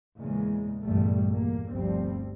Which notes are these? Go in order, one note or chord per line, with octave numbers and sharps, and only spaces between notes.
E2 A#2 C#3 G#3
B1 E2 G2 A#2 G3 A3
E2 A#3
G1 D2 B2 F3 G3 C4